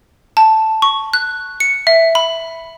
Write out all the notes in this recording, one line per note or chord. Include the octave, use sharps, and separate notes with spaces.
A5
C#6
F#6
C#7
E5
B5